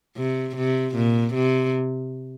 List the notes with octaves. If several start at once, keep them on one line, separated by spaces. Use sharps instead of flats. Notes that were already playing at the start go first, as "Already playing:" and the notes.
C3
C3
A#2
C3